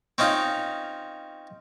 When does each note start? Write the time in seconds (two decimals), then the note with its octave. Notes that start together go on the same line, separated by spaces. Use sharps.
0.18 C4 C#4 D#4 F4